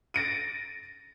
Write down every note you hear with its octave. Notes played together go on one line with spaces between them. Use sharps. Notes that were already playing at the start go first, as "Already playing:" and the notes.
A6 A#6 D7 D#7